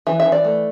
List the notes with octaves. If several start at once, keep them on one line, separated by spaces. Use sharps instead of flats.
E3 E5
E5
E3
D5
A3